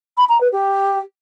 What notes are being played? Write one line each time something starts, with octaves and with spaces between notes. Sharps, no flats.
B5
A#5
B4
G4